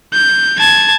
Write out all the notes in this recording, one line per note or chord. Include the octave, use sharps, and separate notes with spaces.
G6
A5 G#6